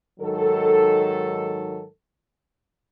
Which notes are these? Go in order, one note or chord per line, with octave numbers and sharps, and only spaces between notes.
G#2 D#3 F#3 A4